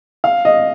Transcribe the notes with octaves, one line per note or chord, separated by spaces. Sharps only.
F5
D#5